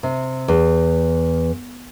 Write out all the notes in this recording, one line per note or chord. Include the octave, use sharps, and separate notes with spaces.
C3
E2